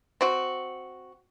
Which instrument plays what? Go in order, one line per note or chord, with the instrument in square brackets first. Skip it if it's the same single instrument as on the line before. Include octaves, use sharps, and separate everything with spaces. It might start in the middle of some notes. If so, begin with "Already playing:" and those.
[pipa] C4 F#4